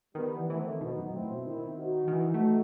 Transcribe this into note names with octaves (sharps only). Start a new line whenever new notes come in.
D#3 G3 B3
E3
E3 A3 C4
D#3
B2 B3 D#4
F#2
A2 C4 E4
B2
D#3 C4 E4
D#4 F#4
D#3
E3
A3